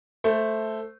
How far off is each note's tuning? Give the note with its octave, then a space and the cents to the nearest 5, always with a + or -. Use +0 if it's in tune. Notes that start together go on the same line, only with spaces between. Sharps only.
A3 +0 C5 +0